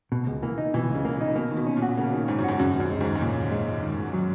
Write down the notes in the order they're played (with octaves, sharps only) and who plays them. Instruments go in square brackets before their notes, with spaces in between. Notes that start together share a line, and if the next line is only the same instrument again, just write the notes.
[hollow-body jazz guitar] B2
C#2
[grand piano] E3 [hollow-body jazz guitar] A#3
[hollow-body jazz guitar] D#4
[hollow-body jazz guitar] B2 [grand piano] E3
[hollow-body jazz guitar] C#2
[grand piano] C#3
[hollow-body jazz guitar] A#3
[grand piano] A#2
[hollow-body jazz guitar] D#4
[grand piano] B2 [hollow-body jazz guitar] A#3
[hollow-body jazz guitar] D#3
[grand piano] B2
[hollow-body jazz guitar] C#4
[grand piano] A#2
[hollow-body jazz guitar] F#4
[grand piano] C#3 [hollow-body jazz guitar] A#3
[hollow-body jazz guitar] D#3
[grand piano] G#2 [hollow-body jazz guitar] C#4
[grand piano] F#2
[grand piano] G#2 [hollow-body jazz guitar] F#4
[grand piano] F#2 [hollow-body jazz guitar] C#3
[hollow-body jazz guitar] D#2
[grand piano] F#2
[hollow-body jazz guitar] G#3
[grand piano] G#2
[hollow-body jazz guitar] D#2
[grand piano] G#2
[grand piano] A#2 [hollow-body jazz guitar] C#3
[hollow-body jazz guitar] D#2
G#3
D#2
D#3
G#2
F#3